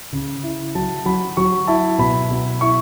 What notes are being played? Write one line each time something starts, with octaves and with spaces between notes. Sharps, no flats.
C#3
E4
F#3 A5
F#3 B5
F#3 C#6
E4 A5
B2 B5
B2
E4 C#6